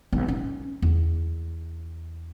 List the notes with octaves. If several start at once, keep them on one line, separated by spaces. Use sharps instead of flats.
B1
C#4
E2